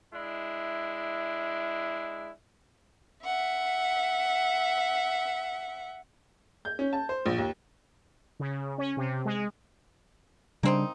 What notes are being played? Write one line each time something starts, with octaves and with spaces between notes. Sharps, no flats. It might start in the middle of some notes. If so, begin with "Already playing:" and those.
G#3 D4 E4
E5 F#5
G6
C#4
A5
C5
A#1
D#2
C#3
C#4
C3
G#3
C#3 G3 A#3 C4 D4 D#4